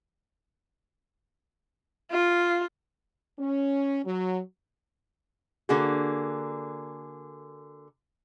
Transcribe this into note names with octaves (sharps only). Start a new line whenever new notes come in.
F4
C#4
F#3
D3 A#3 F#4 G#4